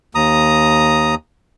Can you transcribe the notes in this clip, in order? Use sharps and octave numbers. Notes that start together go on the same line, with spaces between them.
D#2 A#5 D#6